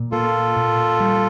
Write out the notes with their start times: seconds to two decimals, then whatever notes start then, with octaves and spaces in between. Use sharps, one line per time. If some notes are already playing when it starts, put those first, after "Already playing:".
Already playing: A#2
0.11 A#3 F4 A4
0.57 A#2
1.00 G3